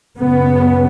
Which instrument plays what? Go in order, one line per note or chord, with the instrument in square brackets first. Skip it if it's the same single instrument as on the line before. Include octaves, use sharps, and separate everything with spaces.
[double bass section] F#2 C#3 B3